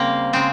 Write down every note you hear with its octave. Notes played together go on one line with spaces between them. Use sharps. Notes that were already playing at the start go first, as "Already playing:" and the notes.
Already playing: C#3 G3 A#3 C4
C#3 G#3 C4